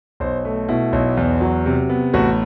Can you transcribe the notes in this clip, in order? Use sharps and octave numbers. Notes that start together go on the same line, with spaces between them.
B1 C5
A3
B2 E4
B1
E2
F#3
C3
B3
A1 F#4